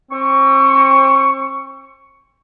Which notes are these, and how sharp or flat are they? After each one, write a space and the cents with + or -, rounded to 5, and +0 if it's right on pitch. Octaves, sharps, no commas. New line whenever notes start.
C4 +40 C#6 +10